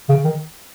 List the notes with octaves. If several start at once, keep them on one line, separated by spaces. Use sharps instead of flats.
C#3
D#3